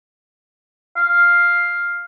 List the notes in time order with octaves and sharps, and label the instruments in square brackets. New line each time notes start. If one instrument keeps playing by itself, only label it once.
[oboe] F5